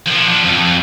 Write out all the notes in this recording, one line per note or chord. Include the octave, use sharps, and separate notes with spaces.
F3 D4
F2